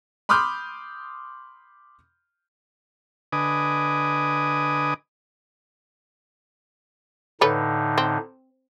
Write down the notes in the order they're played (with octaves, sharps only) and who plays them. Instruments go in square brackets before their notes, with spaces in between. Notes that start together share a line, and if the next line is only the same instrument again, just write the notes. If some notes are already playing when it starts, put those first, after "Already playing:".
[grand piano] B5 C6 D6 D#6 F6 G6
[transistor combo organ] D3 B4 D#5 G#5 D6 D#6
[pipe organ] A2 D3 D#4 [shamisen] A4 B4 C#5
[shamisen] C4